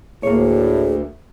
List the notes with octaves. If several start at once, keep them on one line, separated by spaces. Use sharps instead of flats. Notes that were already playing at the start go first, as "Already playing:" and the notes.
D2 A2 A#3 G#4 C#5